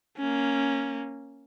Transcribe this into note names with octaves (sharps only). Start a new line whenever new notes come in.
A#3 C#4